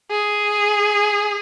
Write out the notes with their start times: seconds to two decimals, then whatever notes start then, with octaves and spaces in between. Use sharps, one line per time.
0.11 G#4